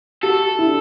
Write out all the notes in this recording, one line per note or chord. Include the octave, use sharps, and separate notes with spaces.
F#4 A4
E4
D4